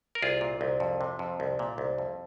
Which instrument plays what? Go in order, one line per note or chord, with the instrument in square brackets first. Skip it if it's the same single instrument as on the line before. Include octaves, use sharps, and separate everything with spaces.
[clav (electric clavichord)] A#4
C2 F4 G#4
A#2
C2
F2
C3
F2
C2
A#2
C2
F2